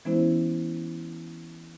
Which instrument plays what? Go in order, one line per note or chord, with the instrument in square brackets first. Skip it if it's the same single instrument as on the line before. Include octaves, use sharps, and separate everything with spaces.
[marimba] E3 G#3 B3 C#4 E4 C5